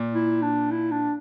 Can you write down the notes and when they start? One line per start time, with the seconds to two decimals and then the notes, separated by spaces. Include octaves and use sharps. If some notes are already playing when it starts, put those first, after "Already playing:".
Already playing: A#2
0.14 E4
0.42 D4
0.71 E4
0.91 D4